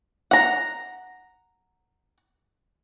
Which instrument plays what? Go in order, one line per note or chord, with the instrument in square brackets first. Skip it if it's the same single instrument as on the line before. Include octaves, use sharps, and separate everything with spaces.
[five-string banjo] F#5 A#5